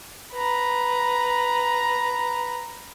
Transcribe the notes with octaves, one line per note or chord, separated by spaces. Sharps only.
B4 A#5